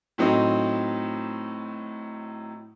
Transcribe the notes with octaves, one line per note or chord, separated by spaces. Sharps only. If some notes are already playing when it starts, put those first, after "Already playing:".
A2 F#3 C4 D#4